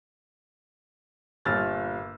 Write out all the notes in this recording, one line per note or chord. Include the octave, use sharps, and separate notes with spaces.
G1 A#2 E6 F6 A6